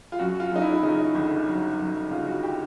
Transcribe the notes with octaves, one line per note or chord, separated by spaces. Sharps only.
F4
F#2 F#4
F4
F#2 D#4
E4
E4
C#3 D#4
G1
F#3
F#2
C#3 F4
F#4
G4